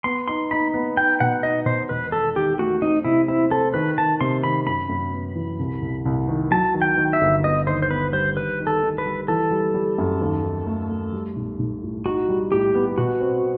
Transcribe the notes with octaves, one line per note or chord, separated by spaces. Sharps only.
B3 C6
D#4 C6
D#4 B5
B3
D#4 G5
B2 F#5
D#4 D#5
B2 C5
E1 B4
D#3 A4
D#3 G4
A3 F#4
C4 D#4
C3 E4
C4 E4
C4 A4
D#3 B4
D#3 A5
C3 C6
D#3 B5
F#2 B5
F#2
B3
E3
C2
C2
C2
D#3
F#3 A5
D#3
G5
D#3
E5
G1
B3 D#5
D#2 C5
C5
B3 B4
G3 C5
D#3 B4
D#3
A4
D#3
B4
G3
E3 A4
G3
G3
F#2
D#2
D#3
A3
A3
G3
B1
B1
A2
D#4 F#4
G3
A2 G4
B3
B2 F#4
C4